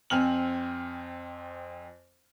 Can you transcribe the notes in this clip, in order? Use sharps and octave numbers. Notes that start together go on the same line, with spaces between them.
F2 C4 G#5 F6 F7 F#7